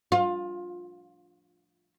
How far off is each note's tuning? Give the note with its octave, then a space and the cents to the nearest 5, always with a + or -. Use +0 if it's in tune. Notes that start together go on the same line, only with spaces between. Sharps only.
F4 +20